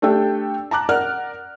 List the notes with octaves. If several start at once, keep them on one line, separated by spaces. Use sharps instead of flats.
A3 D4 G4 A4 G5
A5 A#5 D6 F#6
A#4 D5 F#5 F6